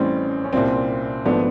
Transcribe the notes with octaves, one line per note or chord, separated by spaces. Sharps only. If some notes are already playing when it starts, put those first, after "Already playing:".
Already playing: A1 A2 E3 G3 C4 C#4
C#4
C2 A#2 G3 C4
G#1 F3 A3 B3 D4